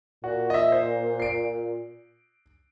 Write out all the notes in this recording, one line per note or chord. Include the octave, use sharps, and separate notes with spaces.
A#2 F#4
D#5 E5
C5
C7 D7